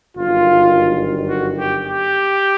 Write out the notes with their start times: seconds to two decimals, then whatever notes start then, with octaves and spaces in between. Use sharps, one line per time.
0.16 G1 F#2 D#3 F4
1.28 F#4
1.57 G4
1.84 G4